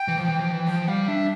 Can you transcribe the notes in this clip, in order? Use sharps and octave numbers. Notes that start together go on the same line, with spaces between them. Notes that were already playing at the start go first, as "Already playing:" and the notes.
Already playing: G5
E3
F3
E3
F3
E3
F3 G5
G3 F5
D4 E5